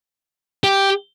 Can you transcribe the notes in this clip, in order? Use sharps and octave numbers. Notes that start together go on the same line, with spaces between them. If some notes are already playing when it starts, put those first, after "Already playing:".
G4